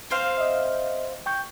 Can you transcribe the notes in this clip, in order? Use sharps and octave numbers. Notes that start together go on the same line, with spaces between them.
C4 C5 F5
D#5 E5
G5 C#6 G6